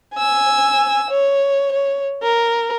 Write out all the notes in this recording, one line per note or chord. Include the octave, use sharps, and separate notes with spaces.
G#5 E6
C#5
C#5
A#4